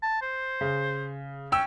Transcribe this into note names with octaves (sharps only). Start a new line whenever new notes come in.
A5
C5
C#3
C#4 G5 E6